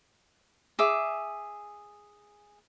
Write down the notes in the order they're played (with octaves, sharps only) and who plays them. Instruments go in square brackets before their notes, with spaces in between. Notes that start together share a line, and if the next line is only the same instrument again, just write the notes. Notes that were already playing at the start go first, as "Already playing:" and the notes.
[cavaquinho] G#4 E5 D6